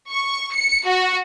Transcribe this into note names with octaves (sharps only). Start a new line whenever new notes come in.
C#6
C#7
F#4